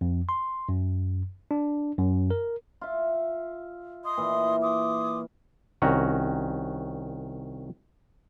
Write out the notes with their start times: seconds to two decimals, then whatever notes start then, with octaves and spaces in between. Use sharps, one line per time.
0.01 F2
0.29 C6
0.69 F#2
1.51 D4
1.99 F#2
2.30 A#4
2.81 F4 E5
4.04 D#5 C6 D#6
4.18 A#2 E3
4.61 C6 D6 D#6
5.82 C2 D#3 C#4 F#4 A#5